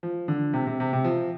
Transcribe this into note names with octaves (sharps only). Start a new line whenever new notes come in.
F3
D3
C3
C3
C3
C3
F3